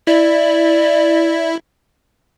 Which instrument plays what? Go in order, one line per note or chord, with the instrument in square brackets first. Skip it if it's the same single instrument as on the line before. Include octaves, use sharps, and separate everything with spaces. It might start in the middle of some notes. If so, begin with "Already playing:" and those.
[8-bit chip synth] E4 [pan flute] D5